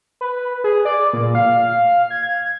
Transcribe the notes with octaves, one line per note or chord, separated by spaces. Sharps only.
B4
G#4
D5
A#2
F5
G#6
G#6